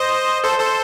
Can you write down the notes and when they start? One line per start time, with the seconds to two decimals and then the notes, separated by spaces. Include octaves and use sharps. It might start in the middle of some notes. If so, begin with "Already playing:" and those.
Already playing: C5 D#5
0.44 A4 C5
0.58 A4 C5